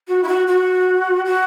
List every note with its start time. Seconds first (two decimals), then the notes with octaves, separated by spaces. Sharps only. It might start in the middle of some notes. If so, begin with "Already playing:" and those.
0.08 F#4
0.23 E4
0.28 F#4
0.47 F#4
1.25 F#4